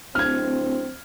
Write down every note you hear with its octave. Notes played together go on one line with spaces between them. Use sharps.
D1 C4 F6 G#6